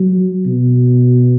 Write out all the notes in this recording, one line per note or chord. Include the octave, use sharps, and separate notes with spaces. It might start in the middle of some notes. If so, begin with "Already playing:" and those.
Already playing: F#3
B2